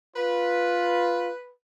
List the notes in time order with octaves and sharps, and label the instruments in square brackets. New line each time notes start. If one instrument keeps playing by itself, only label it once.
[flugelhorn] F4 [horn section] B4